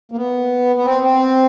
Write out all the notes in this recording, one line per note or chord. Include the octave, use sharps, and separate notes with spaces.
A#3
B3
B3
C4
C4